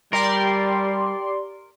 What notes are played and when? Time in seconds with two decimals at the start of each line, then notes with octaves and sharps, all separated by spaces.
0.13 G3 G4 A#4 D5 C6